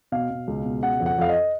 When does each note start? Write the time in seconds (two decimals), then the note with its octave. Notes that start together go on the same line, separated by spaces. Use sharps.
0.12 B2 F5
0.30 B2
0.47 C#2
0.64 B2
0.82 C#3 F#5
1.00 F2
1.06 F#5
1.18 F2 F5
1.29 D#5